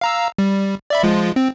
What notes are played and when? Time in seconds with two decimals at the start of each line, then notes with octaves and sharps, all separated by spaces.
0.01 F5 A#5 E6
0.38 G3
0.90 D5 E5 B5
1.03 F3 G#3 F4
1.36 C4